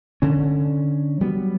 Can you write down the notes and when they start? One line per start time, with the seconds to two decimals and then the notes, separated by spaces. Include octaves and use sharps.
0.22 D3 C#4
1.21 F#3 G3 B3